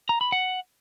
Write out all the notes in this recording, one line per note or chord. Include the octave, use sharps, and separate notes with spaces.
A#5
B5
F#5